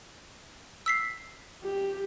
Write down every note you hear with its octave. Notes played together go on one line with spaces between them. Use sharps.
E6 B6 C7
G4